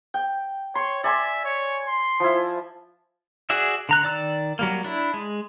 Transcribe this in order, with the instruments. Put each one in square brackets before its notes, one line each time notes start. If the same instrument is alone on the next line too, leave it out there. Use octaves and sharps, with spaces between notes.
[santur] G5
[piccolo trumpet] C#5 [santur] C6
[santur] D5 G#5 C6 [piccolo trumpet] E5
[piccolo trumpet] C#5
C6
[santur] F3 E4
[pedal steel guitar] F#4 G#4 D5 E5
D3 A#5 F#6
D#3 D5 E6
F#3 G3 A#3
D4 E4
G#3